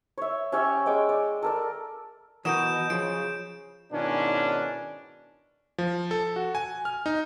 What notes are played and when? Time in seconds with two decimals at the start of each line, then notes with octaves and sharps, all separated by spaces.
0.18 C#5 E5
0.52 C#4 G4 C#5 E5
0.86 G#3 C#5 G5 D6
1.09 D5
1.43 A4 A#4 D5
2.45 B2 E3 F#4 A#4 D#5 G6 D7 E7
2.90 C#3 F3 D7
3.92 G#2 B2 D#3 C#4 D4 E4
5.78 F3
6.11 A4
6.36 F#4
6.55 G#5
6.85 F6
7.06 D#4